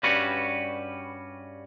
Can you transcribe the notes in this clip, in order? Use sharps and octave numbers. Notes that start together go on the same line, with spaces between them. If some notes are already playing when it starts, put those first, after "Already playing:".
G2 G3 C#4 F#4 B4